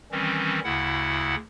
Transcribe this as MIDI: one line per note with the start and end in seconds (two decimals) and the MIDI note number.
0.12 0.60 51
0.12 0.60 52
0.12 0.60 55
0.12 0.60 60
0.12 0.60 61
0.64 1.35 38
0.64 1.35 49
0.64 1.35 64
0.64 1.35 78